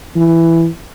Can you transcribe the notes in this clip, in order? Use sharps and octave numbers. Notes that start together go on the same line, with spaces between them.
E3